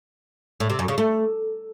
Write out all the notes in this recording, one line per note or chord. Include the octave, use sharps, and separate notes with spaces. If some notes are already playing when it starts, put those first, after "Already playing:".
A2
C3
F#2
C#3
A3